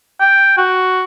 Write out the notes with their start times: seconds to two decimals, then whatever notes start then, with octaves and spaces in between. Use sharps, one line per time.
0.20 G5
0.58 F#4